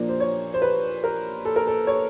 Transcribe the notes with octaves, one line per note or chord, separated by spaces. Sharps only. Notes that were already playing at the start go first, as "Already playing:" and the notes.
Already playing: A#2 F3 A#3 D4
C5
C#5
C5
B4
A#4
A4
A#4
A4
C#5